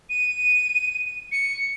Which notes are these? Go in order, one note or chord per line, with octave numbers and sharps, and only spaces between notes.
D#7
C#7